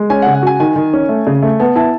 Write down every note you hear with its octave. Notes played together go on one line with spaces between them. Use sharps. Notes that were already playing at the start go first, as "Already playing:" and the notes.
Already playing: G#3
C#4 G#5
F#5
C#3
F#5
F#4 G#5
D#3 G#5
D#3
C#4
A3
C#3
A3
B3 A5
E4 A5